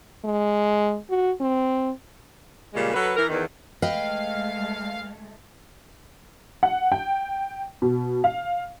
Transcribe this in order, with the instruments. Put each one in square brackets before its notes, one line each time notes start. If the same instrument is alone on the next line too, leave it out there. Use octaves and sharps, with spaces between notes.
[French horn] G#3
F#4
C4
[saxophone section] A#2 C#3 G3 G#3 C#4
F#3 A4 B4
E3 A#4
E2 D#3
[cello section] G#3 A3 [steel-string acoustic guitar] B4 D#5 G5 [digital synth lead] F5
[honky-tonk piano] F#5
G5
B2
F5